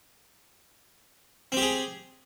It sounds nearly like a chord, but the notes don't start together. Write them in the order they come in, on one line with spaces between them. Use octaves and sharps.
C4 G4 G#4